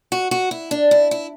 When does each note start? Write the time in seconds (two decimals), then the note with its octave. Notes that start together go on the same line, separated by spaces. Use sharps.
0.12 F#4
0.31 F#4
0.51 E4
0.71 D4
0.91 E4
1.11 E4